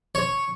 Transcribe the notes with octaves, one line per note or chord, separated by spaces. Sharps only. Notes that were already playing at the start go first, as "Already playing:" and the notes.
C#5